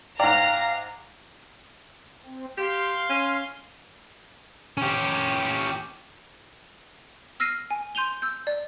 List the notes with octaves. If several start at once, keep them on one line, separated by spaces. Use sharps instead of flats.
G#2 D5 F5 G5 A#5
C4
G4 F5 C6
C#4
C#4 G4
E6 F6 A#6 C7 D#7
G#5
C6 G6 D#7 F7 G7
E6 G6
D5